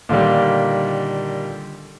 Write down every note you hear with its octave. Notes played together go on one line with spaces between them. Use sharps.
A#2 D3 D#3 G3